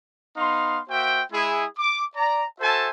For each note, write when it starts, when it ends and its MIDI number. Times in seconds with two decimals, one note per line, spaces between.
0.37 0.80 59
0.37 0.80 63
0.37 0.80 77
0.37 0.80 84
0.90 1.22 58
0.90 1.22 66
0.90 1.22 72
0.90 1.22 76
0.90 1.22 79
1.32 1.65 56
1.32 1.65 64
1.32 1.65 68
1.79 2.03 86
2.16 2.44 74
2.16 2.44 82
2.61 2.90 66
2.61 2.90 69
2.61 2.90 72
2.61 2.90 76
2.61 2.90 80
2.61 2.90 81